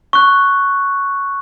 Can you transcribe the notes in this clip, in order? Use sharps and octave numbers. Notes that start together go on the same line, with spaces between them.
C#6 F#6